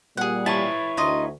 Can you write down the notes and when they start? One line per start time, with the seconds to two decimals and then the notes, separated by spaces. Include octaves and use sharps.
0.17 A#2 G3 G#4 F#5
0.46 E4 B4 C#5 A5
0.97 D2 D#4 F4 D#5